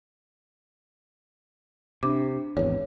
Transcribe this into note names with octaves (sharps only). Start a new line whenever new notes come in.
C3 D4 D6
G#1 E2 C#5